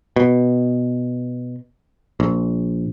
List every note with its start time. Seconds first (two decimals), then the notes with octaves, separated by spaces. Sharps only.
0.16 B2
2.20 A#1